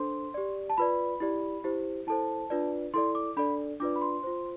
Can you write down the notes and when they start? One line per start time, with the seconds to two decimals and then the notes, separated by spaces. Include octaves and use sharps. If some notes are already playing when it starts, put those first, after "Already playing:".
Already playing: D4 A4 C5 C6
0.34 G4 D5
0.70 A5
0.78 F4 B4 D5 B5
1.20 E4 G4 D5
1.64 E4 G4 C5
2.07 E4 A4 C5 A5
2.50 D4 F4 B4 D5
2.94 E4 A4 D5 C6
3.15 D6
3.37 D4 A4 D5 B5
3.80 D4 F4 B4 D5 D6
3.96 B5
4.02 C6
4.23 F4 C5